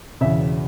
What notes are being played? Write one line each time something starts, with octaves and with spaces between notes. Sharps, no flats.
E1 E2 C#3 E5